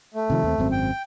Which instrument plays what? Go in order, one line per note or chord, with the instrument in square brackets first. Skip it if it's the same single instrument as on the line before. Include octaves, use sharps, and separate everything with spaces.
[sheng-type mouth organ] A3
[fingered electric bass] C3 D#3 F3
D#2 A#3 C4
G#1 F#2 C4
[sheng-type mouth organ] G5